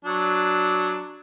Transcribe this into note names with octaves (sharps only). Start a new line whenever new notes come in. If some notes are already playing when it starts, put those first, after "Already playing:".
F#3 D4